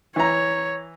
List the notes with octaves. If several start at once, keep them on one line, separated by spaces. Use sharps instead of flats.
E3 C#5 A#5